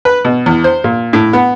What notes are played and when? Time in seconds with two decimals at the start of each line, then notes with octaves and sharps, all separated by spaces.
0.05 B4
0.25 B2
0.46 E2
0.64 C5
0.84 A#2
1.13 A2
1.33 B3